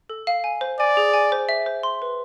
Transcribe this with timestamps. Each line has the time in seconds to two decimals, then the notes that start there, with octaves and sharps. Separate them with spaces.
0.10 A4
0.27 F5
0.44 G#5
0.61 C5
0.79 D5 G#5
0.97 G#4
1.14 G#5
1.32 C5
1.49 E5
1.66 C5
1.83 C6
2.02 B4